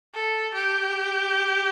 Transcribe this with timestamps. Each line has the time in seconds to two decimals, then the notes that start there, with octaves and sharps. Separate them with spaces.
0.14 A4
0.54 G4